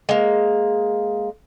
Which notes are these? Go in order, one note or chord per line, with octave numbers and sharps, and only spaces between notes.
G#3 A#3